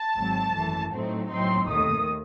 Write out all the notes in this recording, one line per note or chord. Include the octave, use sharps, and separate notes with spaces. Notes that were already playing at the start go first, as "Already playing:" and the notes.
Already playing: A5
G#1 G#2 F#3 C4
G#1 F#2 E3 A3
A2 F#3 A3 C4 D#4
A2 F#3 C4 D#4 C6
D#2 D#3 A3 D#6